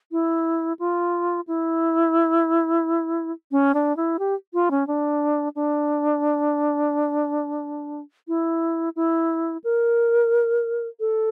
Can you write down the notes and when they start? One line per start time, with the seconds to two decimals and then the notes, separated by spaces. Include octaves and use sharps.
0.12 E4
0.79 F4
1.47 E4
3.51 C#4
3.74 D4
3.96 E4
4.19 G4
4.53 F4
4.71 C#4
4.87 D4
5.55 D4
8.28 E4
8.96 E4
9.64 A#4
11.00 A4